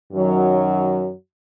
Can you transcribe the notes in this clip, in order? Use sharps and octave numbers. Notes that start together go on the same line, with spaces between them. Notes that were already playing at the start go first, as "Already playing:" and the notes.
F#2 D#3 F#3